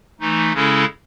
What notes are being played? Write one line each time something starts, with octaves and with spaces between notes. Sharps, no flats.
E3 A3 D#4
C#3 G#3 C#4 E4 A4